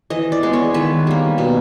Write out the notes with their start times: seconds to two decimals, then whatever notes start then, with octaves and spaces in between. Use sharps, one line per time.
0.10 E3 D#5
0.32 D5
0.43 G#3 B3
0.53 C#5
0.74 D#3 B4
1.07 G3 A#3
1.38 B2